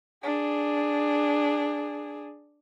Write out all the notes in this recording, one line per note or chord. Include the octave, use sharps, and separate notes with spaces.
D4 G#4